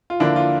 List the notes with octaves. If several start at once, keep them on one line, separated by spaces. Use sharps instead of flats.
F4
D3 F3 A#3 D4 E4
F4